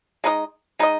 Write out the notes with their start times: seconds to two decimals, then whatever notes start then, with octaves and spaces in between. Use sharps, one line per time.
0.24 G#3 D#4 A#4 D#5
0.79 G#3 D#4 A#4 D#5